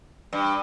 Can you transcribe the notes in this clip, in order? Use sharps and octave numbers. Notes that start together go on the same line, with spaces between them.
G2